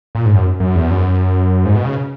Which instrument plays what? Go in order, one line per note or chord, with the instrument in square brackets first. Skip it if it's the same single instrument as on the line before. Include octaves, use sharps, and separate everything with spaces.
[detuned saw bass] A#2
G#2
F#2
F#2
E2
F#2
G#2
B2
C#3